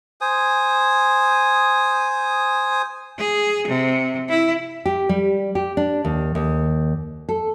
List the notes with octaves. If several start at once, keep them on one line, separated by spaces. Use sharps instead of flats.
C5 G#5 D#6
G#4
C3
E4
G4
G3
G4
D4
D#2
D#2
A4